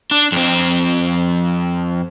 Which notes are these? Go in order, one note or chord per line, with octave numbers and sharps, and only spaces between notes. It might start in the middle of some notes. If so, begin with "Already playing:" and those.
D4
F2 C4